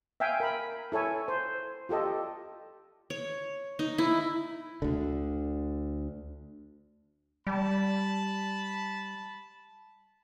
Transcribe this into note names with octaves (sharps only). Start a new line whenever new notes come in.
E5 F5 G5 G#5
A#4 B5
E4 A4 C#5 G#5
C5
F4 G4 A4 D#5
C#5
D#4
E4
D2 D3
G3 A5 B5